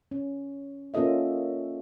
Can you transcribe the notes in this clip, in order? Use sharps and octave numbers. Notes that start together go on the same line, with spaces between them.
C#4
A#3 C#4 F4 A4 D#5 E5